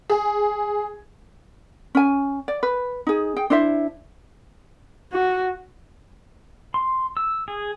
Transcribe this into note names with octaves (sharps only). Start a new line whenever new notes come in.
G#4
C#4 G#5
D5
B4
D#4 G#4
G#4 G5
D4 E4 C5 E5
F#4
C6
E6
G#4